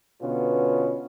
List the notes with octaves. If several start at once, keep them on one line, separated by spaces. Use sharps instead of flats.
B2 D3 B3 C#4 F4